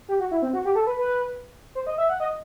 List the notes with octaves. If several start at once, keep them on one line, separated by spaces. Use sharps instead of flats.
G4
F#4
E4
C4
F#4
G4
A4
B4
B4
C5
D#5
E5
F#5
D#5